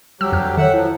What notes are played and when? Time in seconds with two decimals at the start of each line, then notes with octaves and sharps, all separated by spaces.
0.21 D2 F#3 G3 G4 E6
0.32 F2 F6
0.57 D#3 A4 C#5 E5 F#5
0.74 F3 F#3 E4